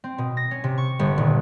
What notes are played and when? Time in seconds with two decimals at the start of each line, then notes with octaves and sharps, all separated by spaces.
0.04 C4
0.18 B2
0.37 A#6
0.51 C#4
0.64 C3
0.78 C#6
0.99 G1
1.18 D#1